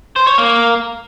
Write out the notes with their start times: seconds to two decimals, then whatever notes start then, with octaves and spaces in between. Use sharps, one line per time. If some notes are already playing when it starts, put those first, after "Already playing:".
0.16 C5
0.27 C#5
0.38 A#3